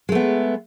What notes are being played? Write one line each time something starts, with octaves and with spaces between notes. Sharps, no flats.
G#3 A3 B3